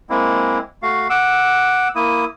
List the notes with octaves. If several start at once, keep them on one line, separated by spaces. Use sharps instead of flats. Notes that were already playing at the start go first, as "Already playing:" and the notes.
G#3 A#3 C4 E4
A3 F#4 F5
F#5 D6 E6
A#3 E4 D#6